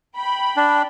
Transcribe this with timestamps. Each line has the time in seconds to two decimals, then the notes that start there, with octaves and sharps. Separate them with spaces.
0.16 G5 B5
0.57 D4